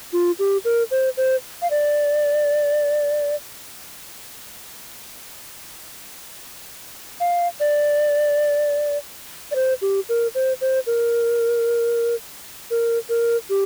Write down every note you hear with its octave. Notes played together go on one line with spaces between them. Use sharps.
F4
G4
A#4
C5
C5
F5
D5
F5
D5
D5
C5
G4
A#4
C5
C5
A#4
A#4
A#4
G4